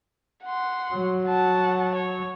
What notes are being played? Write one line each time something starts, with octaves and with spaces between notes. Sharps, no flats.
F#5 C6
F#3
F#5 A5
C#5